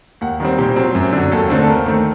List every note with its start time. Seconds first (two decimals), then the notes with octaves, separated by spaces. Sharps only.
0.21 D#2 F#5
0.40 D#3 G3 C4
0.58 A#2 G4
0.76 F#3 C4
0.95 F#2
1.13 D3 F#3
1.32 D#2 A4
1.50 D3 A3 C4
1.63 A4
1.67 D#2 A#4
1.86 D#3 A3 C4